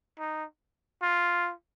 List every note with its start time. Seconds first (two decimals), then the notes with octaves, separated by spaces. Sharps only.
0.19 D#4
1.02 F4